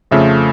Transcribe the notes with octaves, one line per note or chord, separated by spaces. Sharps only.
F2 C#3 F3 A3 E5